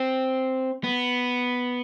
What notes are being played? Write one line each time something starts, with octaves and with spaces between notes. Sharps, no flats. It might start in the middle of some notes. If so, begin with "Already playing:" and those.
Already playing: C4
B3